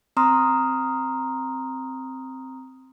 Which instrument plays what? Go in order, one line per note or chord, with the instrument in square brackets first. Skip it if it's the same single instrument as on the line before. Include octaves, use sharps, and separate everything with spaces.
[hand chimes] C4 A#5 C6 D#6 F6